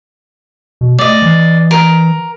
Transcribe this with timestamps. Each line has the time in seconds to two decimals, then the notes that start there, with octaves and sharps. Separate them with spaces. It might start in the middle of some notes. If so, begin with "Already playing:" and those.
0.81 B2
0.99 A3 D5 D#5
1.22 E3
1.71 A#4